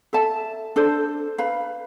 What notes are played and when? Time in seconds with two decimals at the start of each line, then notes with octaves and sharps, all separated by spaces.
0.13 A4 E5 A5
0.76 D4 A4 C5
1.38 B4 F5 B5